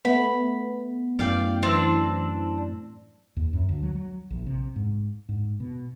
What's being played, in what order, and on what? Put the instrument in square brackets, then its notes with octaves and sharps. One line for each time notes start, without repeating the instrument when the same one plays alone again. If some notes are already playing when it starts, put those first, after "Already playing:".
[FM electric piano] A3 B3 [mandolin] B5
[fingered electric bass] F#2 A2 [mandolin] D5 F5 G5
[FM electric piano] E3 E6 [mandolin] C4 D4
[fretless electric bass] D#2
F#2
D2
F#3
F#3
A#1
C3
G#2
G#2
B2